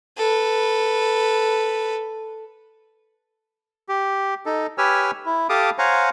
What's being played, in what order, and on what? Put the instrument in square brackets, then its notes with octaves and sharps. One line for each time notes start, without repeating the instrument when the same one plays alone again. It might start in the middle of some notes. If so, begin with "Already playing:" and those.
[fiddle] A4 B4
[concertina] G4
D#4 A4
G4 B4 C#5 G#5 E6 F6
E4
G4 A4 F5 A5 D6 D#6
C5 C#5 F5 F#5 G#5 A#5